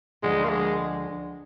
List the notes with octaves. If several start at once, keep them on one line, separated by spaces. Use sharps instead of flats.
D2 D3 F3 G#3
A#3
G#3